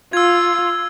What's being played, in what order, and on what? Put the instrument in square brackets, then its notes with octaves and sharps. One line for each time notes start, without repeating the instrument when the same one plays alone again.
[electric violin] F4 [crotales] E6 G#6